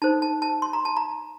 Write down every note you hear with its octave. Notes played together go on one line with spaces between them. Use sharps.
D#4 A4 C5 A5
A5
A5
C6
A#5
A5
A#5